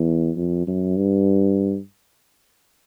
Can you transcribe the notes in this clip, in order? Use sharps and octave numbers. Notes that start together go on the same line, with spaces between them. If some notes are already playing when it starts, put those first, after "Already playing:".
Already playing: E2
F2
F#2
G2